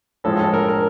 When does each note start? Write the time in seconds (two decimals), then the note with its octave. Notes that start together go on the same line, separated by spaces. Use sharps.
0.24 A2 F3 G#3 A4
0.39 A4
0.54 A#4
0.68 A#4